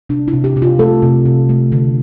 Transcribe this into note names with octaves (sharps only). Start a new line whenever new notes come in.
C3 D4
E4
C3
G4
C3 G4
F4
A3 A4
C3
C3
A3
D3